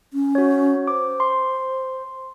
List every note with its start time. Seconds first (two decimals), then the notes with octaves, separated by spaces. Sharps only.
0.14 C#4
0.35 F#4 C#5
0.87 C5 D6
1.20 C6